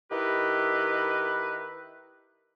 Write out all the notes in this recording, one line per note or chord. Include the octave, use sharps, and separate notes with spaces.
D#3 E4 G4 B4